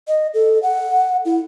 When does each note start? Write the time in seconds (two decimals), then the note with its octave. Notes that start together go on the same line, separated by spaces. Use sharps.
0.08 D#5
0.34 A4
0.63 F#5
1.25 E4